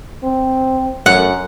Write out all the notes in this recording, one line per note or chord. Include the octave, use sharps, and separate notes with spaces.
C4
F#2 F#5